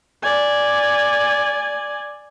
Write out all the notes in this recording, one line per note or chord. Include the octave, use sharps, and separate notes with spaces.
D5 G#5